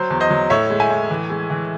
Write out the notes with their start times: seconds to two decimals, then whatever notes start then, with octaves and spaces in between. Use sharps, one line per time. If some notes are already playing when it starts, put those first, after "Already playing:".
Already playing: F#3 C5
0.10 E2
0.20 C5 D#5
0.30 F#3
0.50 A2 C#5 E5
0.70 G#3
0.80 E5 G#5
0.90 A2
1.10 E3
1.30 G#3
1.50 E3